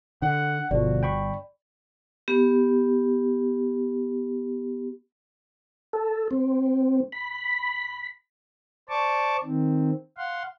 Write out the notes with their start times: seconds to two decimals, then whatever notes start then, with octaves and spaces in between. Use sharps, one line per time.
0.22 D3 F#5
0.71 G1 B2 D3 F3 F#4 D5
1.03 G5 B5 C#6
2.28 B3 G4
5.93 A4
6.31 C4
7.12 B5
8.89 C5 D5 A5 C#6 D6
9.44 D#3 C4
10.17 F5 F#5 C6